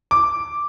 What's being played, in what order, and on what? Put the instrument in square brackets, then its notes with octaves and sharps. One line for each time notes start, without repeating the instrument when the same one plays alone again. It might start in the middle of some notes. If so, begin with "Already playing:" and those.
[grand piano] D6